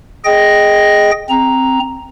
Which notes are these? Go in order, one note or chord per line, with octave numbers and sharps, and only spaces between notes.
G#4 D#5 G5 A#6
C4 A#5